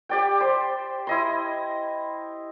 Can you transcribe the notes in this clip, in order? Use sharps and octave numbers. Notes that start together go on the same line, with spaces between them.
G4 D5 G5
C5
E4 D#5 C6